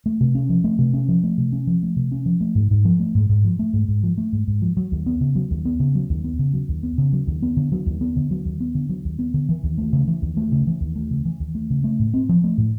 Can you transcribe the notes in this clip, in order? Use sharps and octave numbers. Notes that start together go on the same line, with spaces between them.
A3
C3
C#4
F3
A3
C3
C#4
F3
A3
C3
C#4
F3
A3
C3
C#4
F3
A3
G#2
G#2
F3
A3
G#2
G#2
F3
A3
G#2
G#2
F3
A3
G#2
G#2
F3
F#3
D#2
B3
C#3
F#3
D#2
B3
C#3
F#3
D#2
B3
C#3
F#3
D#2
B3
C#3
F#3
D#2
B3
D3
F#3
D#2
B3
D3
F#3
D#2
B3
D3
F#3
D#2
B3
D3
E3
D#2
A3
C#3
E3
D#2
A3
C#3
E3
D#2
A3
C#3
E3
D#2
A3
C#3
A3
A2
C4
F3
A3
A2